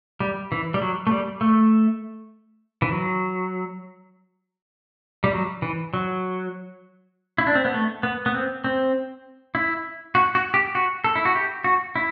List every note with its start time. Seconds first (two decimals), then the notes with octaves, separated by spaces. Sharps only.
0.20 G3
0.52 E3
0.74 G3
0.82 F#3
1.07 A3
1.11 G3
1.41 A3
2.82 E3
2.92 F#3
5.24 G3
5.33 F#3
5.62 E3
5.94 F#3
7.38 E4
7.47 D4
7.55 C4
7.65 B3
7.74 A3
8.03 B3
8.26 B3
8.34 C4
8.64 C4
9.55 E4
10.15 F#4
10.35 F#4
10.54 G4
10.75 F#4
11.04 A4
11.15 E4
11.25 F#4
11.35 G4
11.64 F#4
11.96 E4